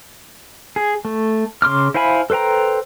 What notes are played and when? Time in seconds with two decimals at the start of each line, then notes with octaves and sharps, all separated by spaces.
0.76 G#4
1.05 A3
1.62 C#3 C6 D6 F6
1.94 E4 C5 F5 G#5 B5
2.30 A4 B4 C5 G5 A#5